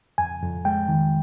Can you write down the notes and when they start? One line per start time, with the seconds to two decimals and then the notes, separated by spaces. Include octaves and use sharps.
0.18 F2 G#5
0.42 F2
0.65 G#3 G5
0.88 D#3